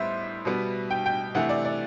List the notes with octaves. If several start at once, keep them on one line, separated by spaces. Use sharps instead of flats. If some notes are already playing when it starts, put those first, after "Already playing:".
Already playing: A2 G3 B3 C5 E5
B2 G3 B3
G5
G5
C3 E3 A3 F#5
D5
D5